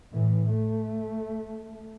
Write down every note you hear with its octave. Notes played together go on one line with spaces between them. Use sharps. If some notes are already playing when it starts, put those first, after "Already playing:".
A2 E3
A3